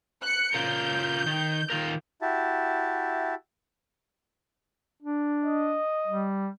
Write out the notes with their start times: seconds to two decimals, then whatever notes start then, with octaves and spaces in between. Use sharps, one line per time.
0.23 F#6 C#7
0.54 C#3 F4 A#4 G6
1.26 D#3
1.70 D#3 F4 A#4
2.22 E4 F#4 G4 E5 A5
5.02 D4
5.45 D#5
6.07 G3